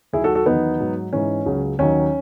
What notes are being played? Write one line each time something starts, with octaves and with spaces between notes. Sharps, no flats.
D#2 D#3 F#3 E4 G#4
F#4 A4
F#4 A4
E2 D#3 F#3 B3 D#4
G#2 F#3
G#2 E3 C#4
C#2 C#3 F#3
D#2 D#3 F#3 C#4